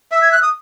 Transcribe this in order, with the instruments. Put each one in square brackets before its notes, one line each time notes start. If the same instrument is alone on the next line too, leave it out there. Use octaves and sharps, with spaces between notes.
[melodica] E5 [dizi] E6
[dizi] G#6
F#6
D#6